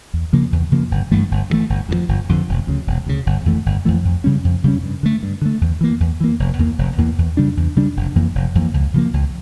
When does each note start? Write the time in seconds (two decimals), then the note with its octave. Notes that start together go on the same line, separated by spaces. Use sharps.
0.14 E2
0.33 C#3 F3 A#3
0.52 E2
0.72 C#3 F3 A#3
0.91 G1
1.11 G2 E3 A3
1.31 G1
1.50 G2 E3 A3
1.70 G1
1.89 F2 D3
1.94 F3
2.09 G1
2.29 F2 D3 F3
2.49 E1
2.67 D2 C#3
2.87 E1
3.07 D2 C#3
3.26 G1
3.45 F2 E3 A3
3.66 G1
3.85 F2 E3 A3
4.05 F2
4.24 C#3 G3 C#4
4.44 F2
4.64 C#3 G3 C#4
4.83 G2
5.03 D3 A3
5.23 G2
5.42 D3 A3
5.61 E2
5.81 E3 A#3
6.00 E2
6.20 E3 A#3
6.40 F1
6.59 E2 E3 A#3
6.79 F1
6.98 E2 E3 A#3
7.18 E2
7.37 C#3 G3 D4
7.57 E2
7.76 C#3 G3 D4
7.96 F1
8.16 F2 E3 A#3
8.35 F1
8.55 F2 E3 A#3
8.74 C#2
8.94 C#3 F3 A#3
9.14 C#2